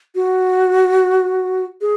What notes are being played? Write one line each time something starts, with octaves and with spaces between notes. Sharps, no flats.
F#4
G#4